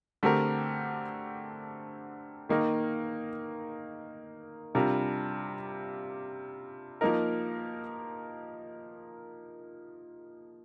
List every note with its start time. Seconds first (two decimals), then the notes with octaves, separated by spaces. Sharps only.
0.23 D3 A3 C4 G4 A#4
2.49 D#3 A#3 D#4 A#4
4.75 C3 G3 D4 F4 A#4
7.01 F3 A#3 D#4 A#4